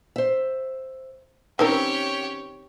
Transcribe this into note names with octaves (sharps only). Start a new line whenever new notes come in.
C5 E5
D#3 C4 C#4 G4 A#4 B4 C#5